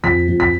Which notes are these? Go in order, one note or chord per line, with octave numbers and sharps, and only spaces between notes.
F2 B6
F2
B6